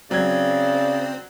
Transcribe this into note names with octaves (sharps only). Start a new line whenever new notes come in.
C#3 F#3 C4 D5 G#6